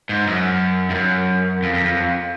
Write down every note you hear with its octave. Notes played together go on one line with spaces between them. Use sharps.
G#2
F#2
G2
F#2
F2
F2
F2
F2